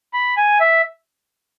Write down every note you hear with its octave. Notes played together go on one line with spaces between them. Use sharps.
B5
G#5
E5